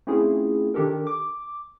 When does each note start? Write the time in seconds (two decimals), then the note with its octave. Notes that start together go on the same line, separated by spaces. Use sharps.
0.07 A3 C4 C#4 E4 F4 G#4
0.74 D#3 D4 G4 A4 A#4
1.07 D6